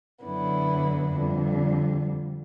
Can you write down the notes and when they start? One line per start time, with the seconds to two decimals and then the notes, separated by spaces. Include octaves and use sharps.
0.24 F#2 D3 F#3 B3 E4
1.14 F2 D3 G3